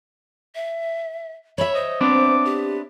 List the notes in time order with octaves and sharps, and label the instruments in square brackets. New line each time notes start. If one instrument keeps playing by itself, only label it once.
[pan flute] E5
[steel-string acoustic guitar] C#5 E5 [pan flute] B5
[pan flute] C5 [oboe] D#5
[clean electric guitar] B3 C4 D4 [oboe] D6
[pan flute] G4